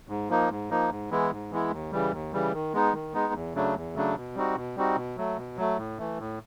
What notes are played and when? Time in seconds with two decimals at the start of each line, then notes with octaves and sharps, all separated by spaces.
0.09 G#2
0.29 F3 A#3 D#4
0.50 G#2
0.70 F3 A#3 D#4
0.90 G#2
1.11 E3 G#3 B3 E4
1.31 G#2
1.51 E3 G#3 B3 E4
1.71 D#2
1.92 C#3 E3 G3
2.12 D#2
2.32 C#3 E3 G3
2.53 D#3
2.74 G#3 B3 D#4
2.93 D#3
3.14 G#3 B3 D#4
3.33 E2
3.54 C#3 F#3 A3 D4
3.75 E2
3.95 C#3 F#3 A3 D4
4.16 B2
4.35 G3 C4 D#4 F#4
4.56 B2
4.76 G3 C4 D#4 F#4
4.96 B2
5.17 F#3 A3
5.37 B2
5.57 F#3 A3
5.78 A2
5.98 E3 A3
6.18 A2